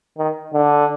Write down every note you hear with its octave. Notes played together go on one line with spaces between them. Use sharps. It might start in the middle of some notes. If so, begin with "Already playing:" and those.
D#3
D3